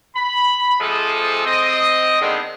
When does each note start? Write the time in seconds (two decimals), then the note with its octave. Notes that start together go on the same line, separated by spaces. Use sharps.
0.16 B5
0.80 C3 F3 G#3 G#4 A4
1.45 C4 D#5
2.21 D3 D#3 G#3 B3 C4